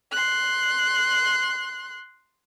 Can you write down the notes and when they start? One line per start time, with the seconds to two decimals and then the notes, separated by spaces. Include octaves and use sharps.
0.12 C6 F#6